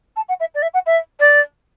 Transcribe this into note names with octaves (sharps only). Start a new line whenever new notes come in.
A5
F#5
E5
D5
E5
F#5
E5
D5